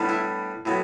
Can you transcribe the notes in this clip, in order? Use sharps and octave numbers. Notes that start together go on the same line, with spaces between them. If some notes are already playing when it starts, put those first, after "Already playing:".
Already playing: A2 G3 B3 D4
E4
A2 F#3 B3